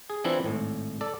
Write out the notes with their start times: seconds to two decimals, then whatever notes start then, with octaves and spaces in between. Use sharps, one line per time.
0.10 G#4
0.24 E3 F3 C4 D4 E4
0.44 G#1 A2
1.01 A4 D5